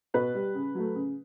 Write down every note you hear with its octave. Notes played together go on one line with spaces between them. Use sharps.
B2 B4
G3
C#3
F#3 A3
C#3